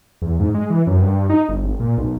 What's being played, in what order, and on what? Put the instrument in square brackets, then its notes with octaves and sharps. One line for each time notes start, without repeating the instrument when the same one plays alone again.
[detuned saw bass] E2
G#2
G#3
E3
F#2
G2
D#4
G1
G#1
A#2
B1